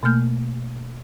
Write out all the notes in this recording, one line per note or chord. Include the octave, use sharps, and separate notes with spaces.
B2 A3 A#3 F6 G6